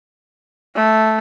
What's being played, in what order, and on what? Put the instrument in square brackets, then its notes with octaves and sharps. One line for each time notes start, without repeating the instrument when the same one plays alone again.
[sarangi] A3